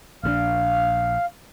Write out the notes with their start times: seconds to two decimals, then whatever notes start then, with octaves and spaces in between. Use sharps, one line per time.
0.23 A#1 C#3 D4 F5